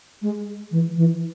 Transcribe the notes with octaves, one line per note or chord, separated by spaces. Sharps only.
G#3
E3
E3